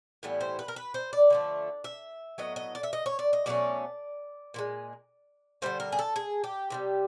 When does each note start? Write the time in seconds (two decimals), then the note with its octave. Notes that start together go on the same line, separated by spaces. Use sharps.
0.23 A2 E3 G3 B3
0.41 C5
0.59 B4
0.68 A#4
0.76 B4
0.94 C5
1.13 D5
1.30 D3 F3 A3
1.84 E5
2.38 A2 F#3 B3 D#5
2.56 D#5
2.75 D5
2.83 E5
2.93 D#5
3.06 C#5
3.19 D5
3.33 D#5
3.46 B2 F#3 A3 C#4 D5
4.54 A#2 F3 G#3
5.62 D3 G3 A#3 C5
5.80 A#4
5.92 G#4
5.99 A4
6.16 G#4
6.44 G4
6.70 C3 E3 G3